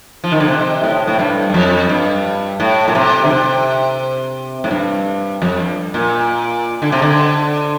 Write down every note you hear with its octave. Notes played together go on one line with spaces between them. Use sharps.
F3
D#3
D3
C3
A2
A2
G2
G2
F2
G2
A2
A#2
C3
D3
C3
A2
G2
F2
G2
A#2
D3
C3
D3